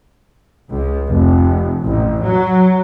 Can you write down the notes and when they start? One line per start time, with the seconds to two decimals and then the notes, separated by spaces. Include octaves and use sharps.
0.71 C#2
1.09 F1
1.82 A1
2.24 F#3